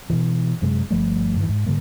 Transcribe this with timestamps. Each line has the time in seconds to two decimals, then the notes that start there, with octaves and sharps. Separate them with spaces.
0.10 B2 E3
0.62 F#2 C3 G#3
0.91 G1 F3 G3 A3
1.36 G2 D#3 E3
1.49 G#2
1.67 G#2 D3 G3 A#3